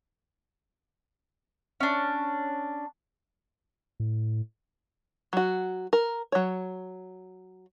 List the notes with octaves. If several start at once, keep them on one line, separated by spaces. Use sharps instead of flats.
C#4 D4
A2
F#3 F#4
A#4
F#3 C#5